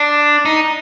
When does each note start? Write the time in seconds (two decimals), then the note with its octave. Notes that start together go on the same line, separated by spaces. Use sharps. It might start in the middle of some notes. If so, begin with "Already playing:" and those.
Already playing: D4
0.45 D#4